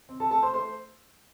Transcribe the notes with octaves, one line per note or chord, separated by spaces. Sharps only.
C4
A4 A5
A3 A4 A5
C5 C6
A3 C5 C6